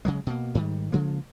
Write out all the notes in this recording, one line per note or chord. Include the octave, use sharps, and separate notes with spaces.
C#3 F#3 G#3
B2 A#3
G#2 D#3 G3
C#3 F3 G#3 A#3